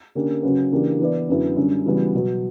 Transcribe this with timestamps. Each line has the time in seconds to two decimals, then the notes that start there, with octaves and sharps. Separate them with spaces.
0.15 D3 A#3 C#4 G4
0.43 C#3 F#3 C#4 F#4 B4
0.72 C#3 E3 A#3 D4 G4
1.00 E3 B3 E4 B4 D5
1.29 F#2 D3 F#3 B3 E4
1.56 F#2 D3 G3
1.85 C#3 E3 G3 B3 F#4
2.14 B2 F#3 B3